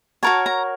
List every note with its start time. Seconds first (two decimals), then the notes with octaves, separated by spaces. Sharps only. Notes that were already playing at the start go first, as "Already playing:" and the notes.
0.23 F#4 A#4 C#5 A5
0.46 A#5